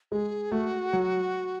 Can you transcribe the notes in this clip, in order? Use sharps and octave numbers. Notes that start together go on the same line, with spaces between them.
G#3 G#4
A3 F#4
F#3